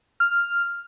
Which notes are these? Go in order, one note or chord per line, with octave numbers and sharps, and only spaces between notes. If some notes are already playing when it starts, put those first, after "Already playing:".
F6